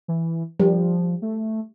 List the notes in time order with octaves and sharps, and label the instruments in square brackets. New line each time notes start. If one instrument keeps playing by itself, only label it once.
[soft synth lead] E3
[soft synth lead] F3 [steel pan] G3
[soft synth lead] A3